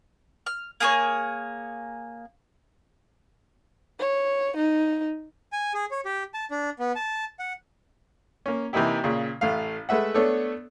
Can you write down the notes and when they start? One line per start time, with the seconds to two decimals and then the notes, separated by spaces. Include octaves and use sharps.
0.46 F6
0.80 A#3 G#4 A4 C#5
4.00 C#5
4.57 D#4
5.52 G#5
5.74 G#4
5.91 C#5
6.05 G4
6.34 A5
6.51 D4
6.79 B3
6.96 A5
7.39 F#5
8.46 A#3 C#4
8.73 C3 E3 A#3 D#4 E4 G4
9.04 A#2 C#3
9.41 A1 A3 F5
9.89 G#3 A3 B4 E5 F#5
10.14 A3 B3 D4 A4 C#5